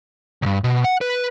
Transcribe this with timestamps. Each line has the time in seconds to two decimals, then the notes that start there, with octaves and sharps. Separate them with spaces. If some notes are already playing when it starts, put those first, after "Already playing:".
0.42 C2 G2
0.64 B2
0.84 F#5
1.01 B4